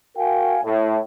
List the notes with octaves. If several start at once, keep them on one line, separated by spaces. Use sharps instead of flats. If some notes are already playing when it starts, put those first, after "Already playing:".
F#4 A#4 F5 G5 G#5
A2